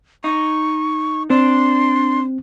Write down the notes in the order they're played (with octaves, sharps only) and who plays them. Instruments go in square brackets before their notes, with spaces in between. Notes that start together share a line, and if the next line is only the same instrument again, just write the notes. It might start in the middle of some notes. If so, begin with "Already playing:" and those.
[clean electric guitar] D#4 [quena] C#6
[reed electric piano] C4 [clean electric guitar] D4 [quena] C6